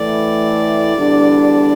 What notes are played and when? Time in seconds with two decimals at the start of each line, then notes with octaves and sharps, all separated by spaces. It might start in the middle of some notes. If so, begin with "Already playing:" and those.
Already playing: A2 E3 A3 E4 D5
0.97 E2 D3 G3 D4